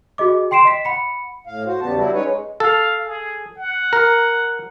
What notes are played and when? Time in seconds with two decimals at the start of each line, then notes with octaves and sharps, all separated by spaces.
0.18 F#4 G#4 D#5 D6
0.51 G5 C6 C7 D7 E7
0.65 D#5 B6
0.85 F#5 B5 C#7
1.47 A2 F5
1.66 F#4 C5
1.81 E2 C#3 G3 B3 A5
1.96 F#3 G3 E4 F#4
2.14 G#3 C#4 D#4 B4 C#5
2.26 G#3
2.60 A4 F5
3.05 G#4
3.58 F#5
3.93 A#4